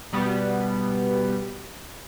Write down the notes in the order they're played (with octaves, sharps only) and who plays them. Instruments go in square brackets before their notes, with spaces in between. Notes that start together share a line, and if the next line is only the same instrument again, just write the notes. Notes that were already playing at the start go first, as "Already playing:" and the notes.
[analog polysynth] B2 G3 B3